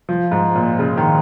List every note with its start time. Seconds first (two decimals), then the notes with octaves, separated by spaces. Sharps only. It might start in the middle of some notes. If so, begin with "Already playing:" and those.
0.09 F3
0.32 G#2
0.55 A#2
0.79 C#3
0.97 D#3